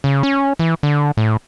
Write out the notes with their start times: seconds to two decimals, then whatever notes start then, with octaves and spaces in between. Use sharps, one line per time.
0.04 C#3
0.23 C#4
0.59 E3
0.83 D3
1.17 A2